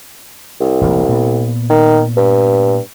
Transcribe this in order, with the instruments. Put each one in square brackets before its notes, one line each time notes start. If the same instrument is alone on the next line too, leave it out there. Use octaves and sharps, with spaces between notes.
[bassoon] C2
[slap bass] E1 A1 A#3
A#2 B3
[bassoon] D#3
G2